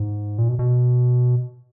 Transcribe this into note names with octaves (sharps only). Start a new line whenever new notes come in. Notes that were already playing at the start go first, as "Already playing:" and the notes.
Already playing: G#2
A#2
B2
B2